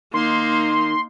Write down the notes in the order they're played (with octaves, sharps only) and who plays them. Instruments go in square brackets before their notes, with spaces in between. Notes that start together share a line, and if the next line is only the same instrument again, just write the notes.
[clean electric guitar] D#3 [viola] A#3 D#4 [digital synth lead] C6